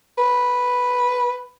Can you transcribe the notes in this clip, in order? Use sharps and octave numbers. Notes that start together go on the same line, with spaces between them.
B4